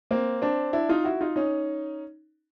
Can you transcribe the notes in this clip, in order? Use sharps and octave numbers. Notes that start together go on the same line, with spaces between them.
A#3 C4
C4 D4
D4 E4
D#4 F4
E4 F#4
D#4 F4
C#4 D#4